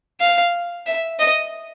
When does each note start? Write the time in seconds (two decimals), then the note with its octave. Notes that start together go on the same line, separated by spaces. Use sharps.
0.21 F5
0.87 E5
1.19 D#5